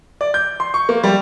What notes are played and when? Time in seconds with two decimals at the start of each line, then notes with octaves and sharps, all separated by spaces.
0.21 D5
0.34 G6
0.60 C6
0.74 C#6
0.89 A#3
1.03 G3